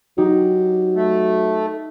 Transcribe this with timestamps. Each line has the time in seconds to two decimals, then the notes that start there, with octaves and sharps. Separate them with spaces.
0.18 F#3 D#4 G4
0.95 A3